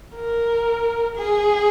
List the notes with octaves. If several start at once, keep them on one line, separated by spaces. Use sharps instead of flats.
A#4
G#4